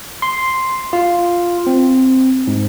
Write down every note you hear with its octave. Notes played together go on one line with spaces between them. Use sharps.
C6
F4
C4
G#2